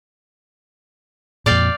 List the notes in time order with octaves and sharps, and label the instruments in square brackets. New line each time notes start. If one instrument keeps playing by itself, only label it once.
[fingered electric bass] F2 A#2 [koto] D5 F5 G5